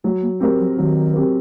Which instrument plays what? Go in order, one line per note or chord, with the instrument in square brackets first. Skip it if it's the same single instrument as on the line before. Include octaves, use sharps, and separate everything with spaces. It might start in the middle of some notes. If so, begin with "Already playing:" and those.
[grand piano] F#3 [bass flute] A3
[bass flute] A#3
[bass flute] A3 [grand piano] C4 G4 A#4
[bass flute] F#3
[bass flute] D#3 [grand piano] F#3
[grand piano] C4 G4 A#4